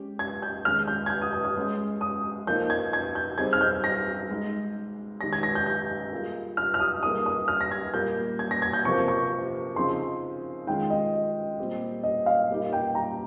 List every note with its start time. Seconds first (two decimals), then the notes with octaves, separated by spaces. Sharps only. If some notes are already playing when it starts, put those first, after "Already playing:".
Already playing: G#3 C#4 G4
0.19 G#6
0.42 G6
0.65 D#3 G#3 C#4 G#4 F6
0.88 G6
1.06 G#6
1.10 G6
1.22 D#6
1.33 D#6
1.44 D#6
1.56 G#3 C#4 G#4
2.01 D#6
2.47 F3 A#3 D#4 G6
2.70 G#6
2.93 G#6
3.15 G6
3.38 G3 C4 D#4 G#4 G#6
3.53 F6
3.61 G6
3.84 A#6
4.30 G#3 D#4 G#4
5.21 D#3 G#3 D#4 G4 A#6
5.33 G#6
5.43 A#6
5.55 G6
5.66 G6
6.12 G3 A#3 F4 G#4
6.57 F6
6.74 F6
6.80 D#6
7.03 G3 A#3 D#4 G#4 D#6
7.26 D#6
7.48 F6
7.61 A#6
7.71 G#6
7.94 A#2 G3 A#3 G6
8.39 G#6
8.51 A#6
8.62 G#6
8.73 G6
8.85 C3 F3 A#3 C#6
9.08 C#6
9.76 C#3 F3 C4 D#4 G#4 C6
10.67 D#3 G#3 C#4 F4 G#4 G5
10.90 D#5
11.59 A#2 G3 C4 G4
12.04 D#5
12.26 F5
12.49 A#2 G3 A#3 D#4 G4
12.73 G5
12.95 A#5